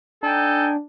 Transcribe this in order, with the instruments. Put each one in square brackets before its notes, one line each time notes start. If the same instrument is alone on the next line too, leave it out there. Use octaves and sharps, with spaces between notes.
[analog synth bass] D4 [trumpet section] D#4 G5 G#5 [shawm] A4